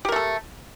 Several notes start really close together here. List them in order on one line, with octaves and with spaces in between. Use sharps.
G4 A#4 A3 A4